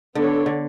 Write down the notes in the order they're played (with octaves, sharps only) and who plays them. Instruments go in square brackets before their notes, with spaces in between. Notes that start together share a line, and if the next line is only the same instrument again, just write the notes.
[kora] D3 [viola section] B3 D4 A4 C#5
[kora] D3